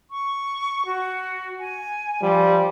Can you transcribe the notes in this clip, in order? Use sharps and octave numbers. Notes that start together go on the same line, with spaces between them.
C#6
F#4
G#5
F3 G3